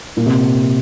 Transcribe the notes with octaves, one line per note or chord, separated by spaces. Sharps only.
A#2
C3